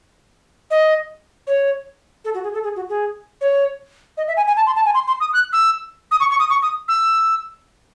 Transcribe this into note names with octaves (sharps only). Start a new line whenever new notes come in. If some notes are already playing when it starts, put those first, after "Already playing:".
D#5
C#5
A4
F#4
G#4
A4
G#4
F#4
G#4
C#5
D#5
E5
G#5
G#5
A5
C6
A5
G#5
C6
C6
D#6
F#6
E6
D#6
C#6
C#6
D#6
C#6
D#6
E6